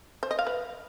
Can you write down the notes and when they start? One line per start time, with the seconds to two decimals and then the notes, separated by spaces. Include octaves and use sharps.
0.23 C5
0.31 D#5
0.39 F5
0.47 B4